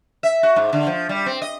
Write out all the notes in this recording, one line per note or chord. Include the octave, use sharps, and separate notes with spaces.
E5
F#4
G#2
D3
F3
G3
C4
D#5